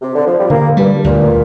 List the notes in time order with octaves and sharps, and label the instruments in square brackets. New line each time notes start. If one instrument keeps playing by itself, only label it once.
[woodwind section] C3
D3
F3
G3
[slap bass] D3 [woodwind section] A#3
[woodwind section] G2 [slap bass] G3
[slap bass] D2 [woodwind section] A#2